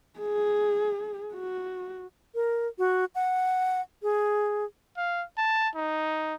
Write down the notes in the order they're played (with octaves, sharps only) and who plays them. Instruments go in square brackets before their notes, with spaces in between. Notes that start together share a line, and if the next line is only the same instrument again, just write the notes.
[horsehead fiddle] G#4
F#4
[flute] A#4
F#4
F#5
G#4
[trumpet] F5
A5
D#4